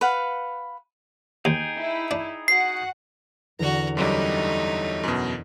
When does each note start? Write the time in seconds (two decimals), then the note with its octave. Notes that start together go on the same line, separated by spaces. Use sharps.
0.01 B4 F5 F#5
1.45 D#2 D#4 G#4 G5
1.78 E4
2.11 D4
2.48 F#4 F#5 C7
3.59 E2 D3 F#4 A#5
3.97 F#2 F#3 G3 A3 D#4 D6 F#6 D7
5.03 F#2 B2